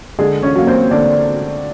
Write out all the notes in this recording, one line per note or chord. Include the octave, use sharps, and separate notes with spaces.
D3 G#3 G#4
C#4 C#5
F#3 A#3
C4 C5
D3 D4 D5